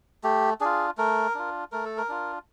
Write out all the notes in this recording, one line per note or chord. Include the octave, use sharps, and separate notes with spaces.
A3 G4
D4 F4 G#4
A3 A#4
D4 F4
A3 A#4
A4
A#4
D4 F4